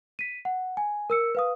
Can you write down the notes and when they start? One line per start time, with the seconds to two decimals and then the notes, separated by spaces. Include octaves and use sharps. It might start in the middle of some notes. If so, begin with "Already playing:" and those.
0.19 B6 D#7
0.45 F#5
0.77 G#5
1.10 A#4 E6 C#7
1.35 B4 F5 D#6